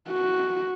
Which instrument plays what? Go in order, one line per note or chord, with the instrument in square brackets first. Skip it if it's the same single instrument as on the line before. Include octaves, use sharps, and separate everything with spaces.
[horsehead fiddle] F#4